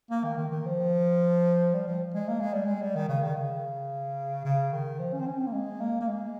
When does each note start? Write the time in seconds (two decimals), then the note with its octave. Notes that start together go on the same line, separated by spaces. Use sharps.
0.10 A#3
0.24 D#3
0.38 D#3
0.52 D#3
0.66 F3
1.74 G3
1.88 F3
2.14 G#3
2.29 A#3
2.40 G#3
2.54 G3
2.66 G#3
2.82 G3
2.96 D#3
3.09 C#3
3.22 D#3
3.36 C#3
4.45 C#3
4.72 D#3
4.99 F3
5.13 C#4
5.20 C4
5.27 C#4
5.40 C4
5.47 A#3
5.53 G#3
5.81 A#3
6.01 A#3
6.08 G#3